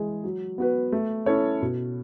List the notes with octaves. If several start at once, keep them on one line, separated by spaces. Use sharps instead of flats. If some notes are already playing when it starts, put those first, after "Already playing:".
Already playing: E3 G#3 G#4
F#3
B3 F#4 B4
A3
C#4 E4 A4 C#5
B2